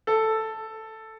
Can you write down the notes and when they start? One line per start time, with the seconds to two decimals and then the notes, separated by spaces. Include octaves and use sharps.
0.07 A4